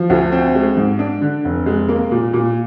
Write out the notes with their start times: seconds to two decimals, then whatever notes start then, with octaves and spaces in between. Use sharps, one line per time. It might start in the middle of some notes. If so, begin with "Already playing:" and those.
Already playing: F3
0.10 D2
0.32 C4
0.55 G#3
0.77 G#2
0.99 D4
1.21 D3
1.45 F1
1.66 G#3
1.89 A#3
2.11 A#2
2.33 A#2